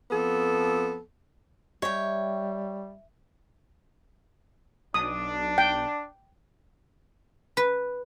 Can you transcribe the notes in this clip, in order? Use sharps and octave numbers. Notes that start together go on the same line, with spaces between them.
F2 B3 A4
G3 C#5 D#5 E5 G5
B1 D4 D#6
G5
B4